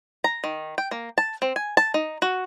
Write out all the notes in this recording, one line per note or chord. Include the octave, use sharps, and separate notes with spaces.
A#5
D#3
G5
A#3
A5
C4
G#5
A5
D#4
F#4